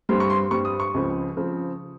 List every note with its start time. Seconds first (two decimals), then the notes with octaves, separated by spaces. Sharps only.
0.09 G2 G3 C4 C6
0.20 C#6
0.30 C6
0.51 G2 G3 C4 C#6
0.65 D#6
0.80 C#6
0.94 C#2 C#3 F3 C4
1.37 C#3 F3 C4